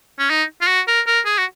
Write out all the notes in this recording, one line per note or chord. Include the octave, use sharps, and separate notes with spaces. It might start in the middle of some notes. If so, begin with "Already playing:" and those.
C#4
D#4
F4
F#4
A#4
A#4
G#4
F#4